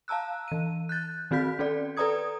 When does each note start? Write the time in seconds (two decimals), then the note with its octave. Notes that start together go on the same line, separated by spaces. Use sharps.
0.08 F5 A5 A#5 E6 F#6
0.48 E3 D#7
0.89 F#6 G6 A6
1.31 D#3 C4 F#4 G6 B6
1.59 C#4 A4 D5
1.97 A4 B4 D5 A#5 D#6 G#6